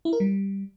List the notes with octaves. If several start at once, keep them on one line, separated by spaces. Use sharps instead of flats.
E4
A#4
G3